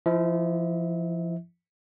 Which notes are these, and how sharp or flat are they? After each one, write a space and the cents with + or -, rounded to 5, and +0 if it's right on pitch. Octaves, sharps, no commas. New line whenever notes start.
F3 -25 E4 +0 E5 -40